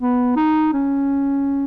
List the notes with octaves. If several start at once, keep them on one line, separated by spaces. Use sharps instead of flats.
B3
D#4
C#4